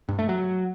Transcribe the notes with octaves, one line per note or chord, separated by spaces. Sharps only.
G2
A3
F#3